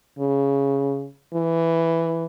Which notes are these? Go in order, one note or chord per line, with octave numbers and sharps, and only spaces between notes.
C#3
E3